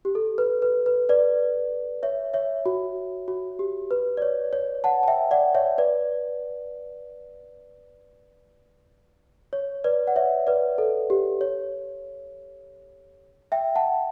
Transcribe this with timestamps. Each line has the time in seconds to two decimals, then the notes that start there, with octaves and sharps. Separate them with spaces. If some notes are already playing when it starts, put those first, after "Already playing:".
0.05 G4
0.15 A4
0.38 B4
0.62 B4
0.86 B4
1.09 B4 D5
2.03 C#5 E5
2.34 C#5 E5
2.66 F#4
3.28 F#4
3.59 G4
3.91 B4
4.17 D5
4.22 C#5
4.53 C#5
4.84 F#5 A5
5.03 A5
5.08 E5 G5
5.31 D5 F#5
5.55 C#5 E5
5.78 B4 D5
9.53 C#5
9.84 B4 D5
10.07 F#5
10.16 C#5 E5
10.47 B4 D5
10.78 A4
11.10 G4
11.41 C#5
13.52 E5 G5
13.75 F#5 A5